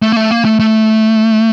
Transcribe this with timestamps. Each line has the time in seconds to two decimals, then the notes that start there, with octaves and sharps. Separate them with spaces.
0.02 A3
0.12 A#3
0.16 A3
0.31 A#3
0.45 A3
0.60 A3